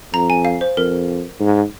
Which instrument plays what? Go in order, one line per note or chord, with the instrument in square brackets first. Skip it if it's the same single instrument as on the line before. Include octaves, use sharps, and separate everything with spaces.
[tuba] F2 [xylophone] A#5
[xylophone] G#5
F5
C5
[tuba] F2 [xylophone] A#4
[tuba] G#2